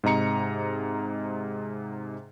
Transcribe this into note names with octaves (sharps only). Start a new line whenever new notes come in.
G#2 C3 D#5 A#5 C#7